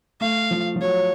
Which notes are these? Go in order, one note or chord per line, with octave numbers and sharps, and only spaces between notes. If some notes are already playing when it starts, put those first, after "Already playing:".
A3 F5
F3
F3
F#3 C#5